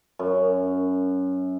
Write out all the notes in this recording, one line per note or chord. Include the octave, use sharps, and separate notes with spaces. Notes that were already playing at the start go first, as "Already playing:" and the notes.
F#2